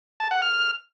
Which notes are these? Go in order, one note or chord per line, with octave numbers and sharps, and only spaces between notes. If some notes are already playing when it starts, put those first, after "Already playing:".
A5
F#5
F6